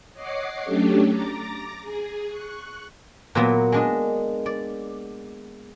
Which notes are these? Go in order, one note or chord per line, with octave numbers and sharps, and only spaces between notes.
C#5 D#5 F#5 D6 C7
F#3 A3 C#4 D4 G4 A4
A#5 D6 A6 A#6
G#4
C#6 F#6
A#2 F#3 A#3 B3
G#3 D4 D#5
D5